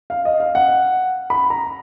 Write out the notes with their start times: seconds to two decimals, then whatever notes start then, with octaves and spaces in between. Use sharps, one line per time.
0.10 F5
0.25 D#5
0.40 F5
0.55 F#5
1.30 B5
1.50 A#5